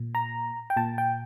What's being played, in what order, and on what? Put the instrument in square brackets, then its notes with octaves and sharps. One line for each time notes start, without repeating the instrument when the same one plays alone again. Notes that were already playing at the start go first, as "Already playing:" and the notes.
Already playing: [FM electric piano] A#2
A#5
G5
A#2 A5
G5